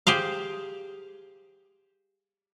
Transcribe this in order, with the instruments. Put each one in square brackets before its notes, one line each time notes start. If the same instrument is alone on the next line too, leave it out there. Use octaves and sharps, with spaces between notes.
[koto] G4 G#4 C5 F5